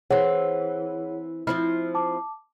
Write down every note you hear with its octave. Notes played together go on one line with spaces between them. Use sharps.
E3 C4 G#4 C#5 F#5
F3 C4 E4 F6
A5 D6